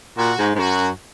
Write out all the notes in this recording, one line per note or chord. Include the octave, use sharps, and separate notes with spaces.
A#2 F#4
G#2
G#2
F#2 F#4